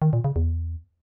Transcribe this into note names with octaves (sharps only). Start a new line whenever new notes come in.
D#3
A#2
C#3
E2